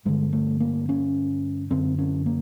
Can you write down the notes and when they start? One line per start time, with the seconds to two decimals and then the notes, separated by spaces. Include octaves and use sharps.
0.05 G2 D3 G#3
0.33 A3
0.60 A#3
0.89 C#4
1.71 F#2 D3 C4
1.99 C#4
2.26 A#3